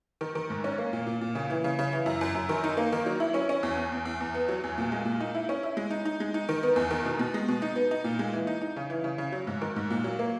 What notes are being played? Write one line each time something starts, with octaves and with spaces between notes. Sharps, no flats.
D#3
D#3
G#2
C#4
A#3
A#2
A#2
A#2
C#3
E3
C#3
C#3
E3
F#2
F#2
F#2
D#3
D#4
A#3
D#3
F#3
E4
C#4
C#4
E2
E2
E2
E2
E2
B3
F#3
E2
A#2
G#3
A#2
D#4
E4
C#4
E4
G#3
D#4
D#4
G#3
D#4
D#3
B3
E2
D#3
B2
B2
G#3
B2
D#4
B3
D#4
A#2
G#3
E3
D#4
D#4
C#3
E3
C#3
C#3
F#3
G#2
D#3
G#2
A#2
F#3
A#3